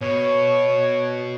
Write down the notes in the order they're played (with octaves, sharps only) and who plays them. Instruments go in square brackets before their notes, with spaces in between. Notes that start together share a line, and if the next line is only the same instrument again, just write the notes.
[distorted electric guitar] B2 [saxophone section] C#5